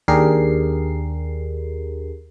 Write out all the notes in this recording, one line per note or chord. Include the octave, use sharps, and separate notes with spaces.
D#2 D4 G4 G#4 A#4 C7